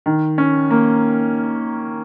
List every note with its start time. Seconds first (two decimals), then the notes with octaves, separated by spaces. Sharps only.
0.06 D#3
0.38 C#4
0.71 A#3